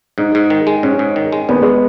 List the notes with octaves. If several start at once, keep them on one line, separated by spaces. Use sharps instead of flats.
G#2 D#4
G#2
D#3
G#3
G#2 C#4
G#2
D#3
G#3
D#2 B3
G#3